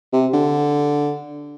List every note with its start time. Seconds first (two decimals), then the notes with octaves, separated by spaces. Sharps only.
0.13 C3
0.33 D3